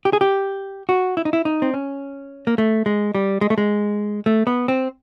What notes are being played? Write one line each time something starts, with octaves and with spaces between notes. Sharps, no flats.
G4
G#4
G4
F#4
E4
D#4
E4
D#4
C4
C#4
A#3
A3
G#3
G3
G#3
A3
G#3
A3
B3
C4